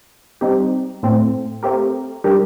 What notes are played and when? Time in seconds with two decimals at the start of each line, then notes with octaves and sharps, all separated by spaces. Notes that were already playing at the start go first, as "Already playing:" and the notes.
0.41 G3 C4 D#4 G4
1.03 A2 A3 C4
1.63 A3 C4 G4 A#4
2.24 G3 D4 G4 A#4